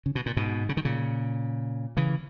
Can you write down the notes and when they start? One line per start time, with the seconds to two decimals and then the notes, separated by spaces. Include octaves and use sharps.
0.06 C#3
0.15 B2
0.26 A#2
0.37 G#2 B2
0.69 C#3
0.77 D#3
0.85 A#2 C#3
1.97 C#3 E3